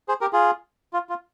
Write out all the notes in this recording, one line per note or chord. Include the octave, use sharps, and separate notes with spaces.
G#4 C5
G4 A#4
F4 G#4
F4
F4